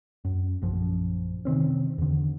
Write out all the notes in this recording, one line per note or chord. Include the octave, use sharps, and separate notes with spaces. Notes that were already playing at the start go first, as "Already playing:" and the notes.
F#2
A#1 F#2 F3
C3 D#3 C4 C#4
E2 D3